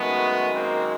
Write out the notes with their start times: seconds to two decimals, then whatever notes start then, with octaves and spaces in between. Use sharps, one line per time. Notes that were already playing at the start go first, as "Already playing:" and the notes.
Already playing: F#2 D#3 G#3 A3 B3
0.56 A#3 C4